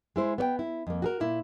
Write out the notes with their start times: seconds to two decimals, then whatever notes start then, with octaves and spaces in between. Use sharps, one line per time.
0.16 G#3 E4 C5
0.38 B3 C#5 G5
0.59 E4
0.87 F2 A#3
1.02 F#4 G#4 A#4
1.20 A#2 A#3 E4